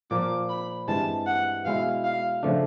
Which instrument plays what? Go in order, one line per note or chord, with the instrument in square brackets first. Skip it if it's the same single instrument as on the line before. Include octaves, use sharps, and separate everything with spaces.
[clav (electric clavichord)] A#2 F3 A#3 [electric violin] D6
[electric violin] B5
[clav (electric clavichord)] G2 E3 G#3 C4 [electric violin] A5
[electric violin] F#5
[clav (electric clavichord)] B2 G#3 C#4 E4 [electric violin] F5
[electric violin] F5
[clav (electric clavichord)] C#3 F3 A3 D4